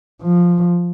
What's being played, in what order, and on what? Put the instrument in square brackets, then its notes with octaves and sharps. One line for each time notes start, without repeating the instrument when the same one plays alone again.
[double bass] F3